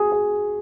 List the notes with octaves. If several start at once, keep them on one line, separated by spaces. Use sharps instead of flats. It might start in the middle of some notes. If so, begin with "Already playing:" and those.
Already playing: F#4 G#4
G#4